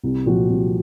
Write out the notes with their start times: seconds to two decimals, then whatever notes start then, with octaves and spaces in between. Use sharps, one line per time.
0.03 C2
0.26 A#2 F3 C4 F#4
0.50 C2